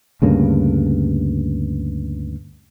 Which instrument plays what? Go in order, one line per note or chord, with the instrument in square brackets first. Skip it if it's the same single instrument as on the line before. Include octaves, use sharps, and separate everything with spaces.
[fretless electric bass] D2 G2 C#3 A#3